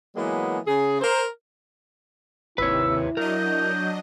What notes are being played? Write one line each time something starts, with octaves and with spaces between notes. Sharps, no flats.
E3 F#3 G#3 A#3 B3
C#3 G#4
A#4 C5
G#1 D#2 C3 E4 B4 C#5 E6
F#3 D4 A#4 D#5 G6